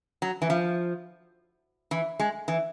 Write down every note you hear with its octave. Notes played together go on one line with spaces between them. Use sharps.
F#3
E3
F3
E3
G#3
E3